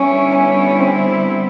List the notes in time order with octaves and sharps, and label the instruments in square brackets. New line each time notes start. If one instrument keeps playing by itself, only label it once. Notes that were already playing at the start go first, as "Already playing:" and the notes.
Already playing: [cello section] D3 G3 B3 E4 [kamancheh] C#4
[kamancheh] C#4
C4